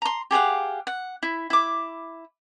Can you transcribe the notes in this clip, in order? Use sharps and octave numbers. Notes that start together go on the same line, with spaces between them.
A#5 C6
G4 G#4 F5 F#5
F#5
E4
E4 D6